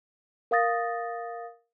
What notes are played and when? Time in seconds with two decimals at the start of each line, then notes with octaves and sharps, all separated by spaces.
0.51 A#4 F5 D#6 A6 A#6